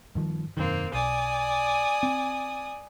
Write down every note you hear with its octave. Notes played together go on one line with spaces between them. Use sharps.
G2 D#3 F3
E1 F#2 D#3 A#3 C4
B1 D5 G#5 D#6
C4